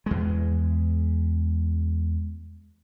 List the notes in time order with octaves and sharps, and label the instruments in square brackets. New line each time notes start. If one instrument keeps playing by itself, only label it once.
[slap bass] E2 G#3